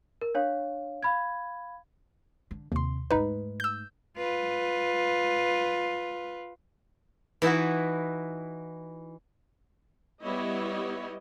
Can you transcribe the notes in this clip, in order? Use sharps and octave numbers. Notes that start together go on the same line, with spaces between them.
A#4
D4 C#5 F5
F5 B5 G#6
D3
D#2 C3 C6
G#2 A3 D#4 B4
E6 G6
F4 B4
E3 D#4 E4 F#4
G3 B3 E4 C#5 D#5